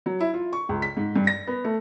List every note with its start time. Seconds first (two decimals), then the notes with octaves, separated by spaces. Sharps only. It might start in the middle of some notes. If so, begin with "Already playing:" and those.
0.06 F#3
0.20 E4
0.34 F4
0.53 C#6
0.69 C#2
0.82 B6
0.97 G#2
1.16 G2
1.27 A#6
1.47 B3
1.64 A3